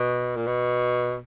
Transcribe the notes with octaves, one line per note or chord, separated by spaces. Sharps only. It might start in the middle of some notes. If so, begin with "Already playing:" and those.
Already playing: B2
A#2
B2